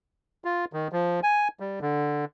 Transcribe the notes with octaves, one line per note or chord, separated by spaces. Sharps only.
F4
D#3
F3
G#5
G3
D3